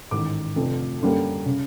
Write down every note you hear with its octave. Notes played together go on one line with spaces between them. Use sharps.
A1 G#2 D#3 D6
F1 F2 D3 F3 A3
F#2 D3 G3 A#3
C#3